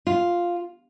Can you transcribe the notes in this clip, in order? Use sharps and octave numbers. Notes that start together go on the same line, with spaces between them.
F4